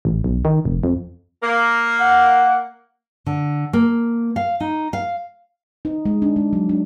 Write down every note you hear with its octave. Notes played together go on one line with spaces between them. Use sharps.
A1
B1
D#3
F1
F2
A#3
F#5
D3
A#3
F5
D#4
F5
D#4
G#3
D4
G#3
F#3
D4